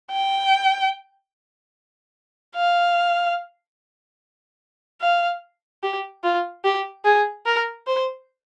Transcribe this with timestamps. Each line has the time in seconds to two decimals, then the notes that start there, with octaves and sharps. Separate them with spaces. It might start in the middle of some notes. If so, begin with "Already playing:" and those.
0.11 G5
2.55 F5
5.01 F5
5.83 G4
6.24 F4
6.64 G4
7.05 G#4
7.46 A#4
7.87 C5